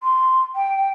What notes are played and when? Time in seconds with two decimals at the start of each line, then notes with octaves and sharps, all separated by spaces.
0.03 C6
0.55 G5